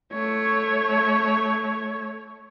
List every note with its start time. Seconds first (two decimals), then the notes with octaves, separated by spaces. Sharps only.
0.13 A3 C#5